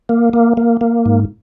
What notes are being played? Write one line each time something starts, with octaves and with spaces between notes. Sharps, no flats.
A#3
A#3
A#3
A#3
G#2